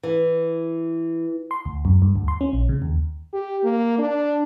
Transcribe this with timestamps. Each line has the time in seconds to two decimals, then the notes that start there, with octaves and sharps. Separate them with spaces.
0.03 E3
1.51 C6
1.65 D2
1.85 F#2
2.02 G2
2.16 D2
2.28 C6
2.41 C#4
2.53 A#1
2.69 C#3
2.82 D#2
3.33 G4
3.64 A#3
3.99 D4